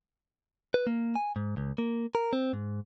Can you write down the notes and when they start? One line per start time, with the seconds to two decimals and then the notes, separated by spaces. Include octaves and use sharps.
0.74 B4
0.87 A#3
1.16 G#5
1.36 G#2
1.57 C#2
1.78 A#3
2.15 A#4
2.33 C4
2.53 G#2